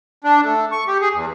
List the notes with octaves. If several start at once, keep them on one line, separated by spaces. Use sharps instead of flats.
D4
A3
C#6
G4
G#4
E2